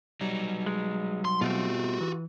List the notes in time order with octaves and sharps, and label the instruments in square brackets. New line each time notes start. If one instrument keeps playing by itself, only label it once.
[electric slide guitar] F#3 D#4 [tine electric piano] G3
[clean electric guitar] G#3
[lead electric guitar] C6
[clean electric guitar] B2 A3 C4 [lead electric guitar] F4 F#4
[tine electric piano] E3